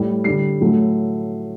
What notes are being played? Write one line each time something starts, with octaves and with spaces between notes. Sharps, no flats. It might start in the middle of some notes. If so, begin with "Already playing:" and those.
Already playing: A2 G3
D3 G3 C7
A2 F#3 A3